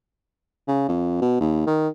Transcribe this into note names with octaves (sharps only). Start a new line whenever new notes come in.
C#3
F2
B2
D#2
D#3